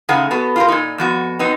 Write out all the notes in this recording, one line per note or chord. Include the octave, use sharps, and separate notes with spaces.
C#3 A3 D#4 G#4 F#5
B3 F#4 A4
F4 G4 A#4
A#2 D#4
F2 B3 F#4
B3 C4 D#4